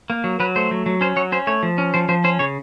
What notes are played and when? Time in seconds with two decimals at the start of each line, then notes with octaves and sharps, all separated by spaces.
0.10 A#3
0.24 F#3
0.40 F#3 B4
0.56 A3 C5
0.71 F#3
0.86 F#3
1.01 C#4 C5
1.16 F#3 C#5
1.32 C#4 C5
1.47 A3 C#5
1.63 F3
1.78 C#4
1.94 F3 C5
2.09 F3 C5
2.24 C#4 C5
2.39 C#3 C#5